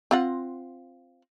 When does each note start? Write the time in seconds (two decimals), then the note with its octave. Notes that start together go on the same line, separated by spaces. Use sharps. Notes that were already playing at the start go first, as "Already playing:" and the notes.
0.11 C4 F4 F#5